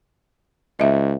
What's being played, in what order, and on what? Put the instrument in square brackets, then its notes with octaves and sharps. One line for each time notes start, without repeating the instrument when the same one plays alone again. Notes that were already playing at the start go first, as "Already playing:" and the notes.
[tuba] C#2 [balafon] D#5 E5